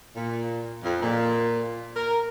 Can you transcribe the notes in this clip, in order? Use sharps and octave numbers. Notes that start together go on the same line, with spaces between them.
A#2
F2
A#2
A#4